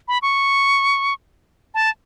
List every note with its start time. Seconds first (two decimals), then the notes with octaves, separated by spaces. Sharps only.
0.08 B5
0.22 C#6
1.74 A5